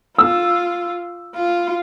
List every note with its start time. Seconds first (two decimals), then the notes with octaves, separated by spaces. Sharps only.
0.18 F4 E6
1.35 F4